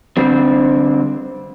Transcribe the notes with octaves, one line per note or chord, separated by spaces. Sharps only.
D3 G3 C4